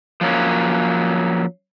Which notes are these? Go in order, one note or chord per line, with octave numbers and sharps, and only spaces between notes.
F3 F#3 A#3 C#4